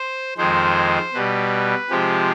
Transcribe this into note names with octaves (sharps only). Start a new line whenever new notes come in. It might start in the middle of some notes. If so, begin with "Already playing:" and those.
Already playing: C5
F2 D#3 G#3 C5
B2 G3 B4
C3 F3 G#3 G4